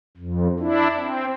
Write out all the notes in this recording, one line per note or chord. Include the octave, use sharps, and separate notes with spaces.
F2
D4 E4
C4